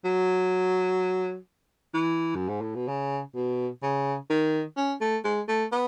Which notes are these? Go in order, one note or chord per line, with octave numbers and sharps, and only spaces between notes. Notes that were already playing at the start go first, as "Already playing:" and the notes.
F#3
E3
F#2
G#2
A2
B2
C#3
B2
C#3
D#3
C#4
A3
G#3
A3
B3